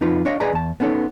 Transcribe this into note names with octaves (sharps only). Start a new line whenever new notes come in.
F2 D#4 F4 B4
D4 C#5 D#5 F5
G#4 B4 D5 D#5 G#5 A#5
E2 A5
B3 C#4 D#4 A4 C#5